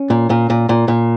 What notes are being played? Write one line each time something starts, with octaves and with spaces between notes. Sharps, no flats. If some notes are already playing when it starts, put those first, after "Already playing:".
Already playing: C#4
A#2
A#2
A#2
A#2
A#2